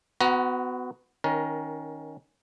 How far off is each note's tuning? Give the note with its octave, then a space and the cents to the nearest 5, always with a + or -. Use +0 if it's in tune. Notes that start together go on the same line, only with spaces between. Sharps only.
B3 +30 F#4 +0 A#5 +40
D#3 +0 C#4 +0 A#4 +25